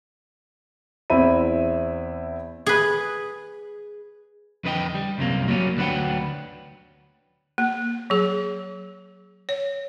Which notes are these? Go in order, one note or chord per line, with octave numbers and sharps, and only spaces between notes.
E2 C4 E4 E5 B5 D#7
G#4 B4
F2 D3 B4 D#5 G5
G3
C2 F#2 C3 A#3
F#3 G3 A#3 B3 C#4
D2 F#3 D4 B4 F#5 G5
A#3
F#3 G#4
C#5